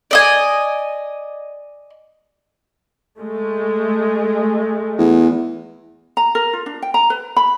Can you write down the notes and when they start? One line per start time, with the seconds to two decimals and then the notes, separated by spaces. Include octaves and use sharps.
0.11 D5 D#5 G#5
3.19 G#3 A3
4.98 E2
6.17 A#5
6.35 A#4
6.53 F4
6.66 D4
6.82 G5
6.94 A#5
7.10 B4
7.36 B5